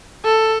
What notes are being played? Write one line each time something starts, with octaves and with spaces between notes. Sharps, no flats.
A4